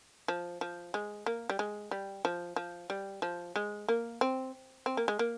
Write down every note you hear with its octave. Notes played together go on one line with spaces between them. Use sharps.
F3
F3
G#3
A#3
G3
G#3
G3
F3
F3
G3
F3
G#3
A#3
C4
C4
A#3
G#3
A#3